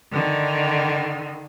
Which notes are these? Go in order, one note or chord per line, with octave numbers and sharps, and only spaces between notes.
D3 D#3